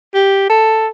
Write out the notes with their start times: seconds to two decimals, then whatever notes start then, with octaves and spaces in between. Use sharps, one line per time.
0.14 G4
0.50 A4